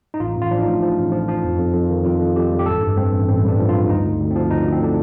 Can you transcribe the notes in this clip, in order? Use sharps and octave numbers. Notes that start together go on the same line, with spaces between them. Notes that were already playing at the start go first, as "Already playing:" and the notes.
D#4
A1 F4
A1 F4
F3 D4
A2 D#4
F3
A1
F3
F3
F2
F2
F2
D#3
F2 F4
F2
F2 G4
G3
G4
A1 A4
G2
G2 C4
A1
A1 C4
G2 D4
F3
G2 F4
D2 D#4
D2
D2
C4
F3
D2 D#4
D2 D4
C4
D3 D4